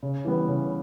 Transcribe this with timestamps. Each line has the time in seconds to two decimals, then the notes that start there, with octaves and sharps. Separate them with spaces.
0.03 C#3
0.25 E3 G3 B3 E4
0.48 C#3